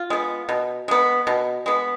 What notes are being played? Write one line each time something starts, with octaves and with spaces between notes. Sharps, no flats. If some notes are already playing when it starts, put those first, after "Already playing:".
Already playing: F4
G#3 B3
B2
G#3 B3
B2
G#3 B3